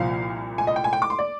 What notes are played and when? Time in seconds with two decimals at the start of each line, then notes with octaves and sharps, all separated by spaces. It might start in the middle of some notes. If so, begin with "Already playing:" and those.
Already playing: C2 A#2 F3 F5
0.58 G#5
0.67 D#5
0.76 G5
0.84 G#5
0.93 G5
1.02 D6
1.10 C6
1.19 D5